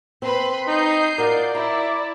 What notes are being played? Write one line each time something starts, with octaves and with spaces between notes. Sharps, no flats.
C4 B4 B5 C6
D#4 G6 C7
F4 F#4 A#4 D5
E4 A#5